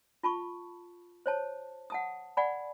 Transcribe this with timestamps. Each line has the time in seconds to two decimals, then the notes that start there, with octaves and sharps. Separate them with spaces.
0.23 F4 A5 B5 C#6
1.26 C5 C#5 A5
1.90 F#5 A5 D#6
2.37 D5 F#5 G#5 B5